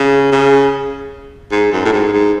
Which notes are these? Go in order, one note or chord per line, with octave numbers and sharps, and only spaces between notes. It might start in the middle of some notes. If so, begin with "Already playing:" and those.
Already playing: C#3
C#3
G#2
F#2
A2
G#2
G#2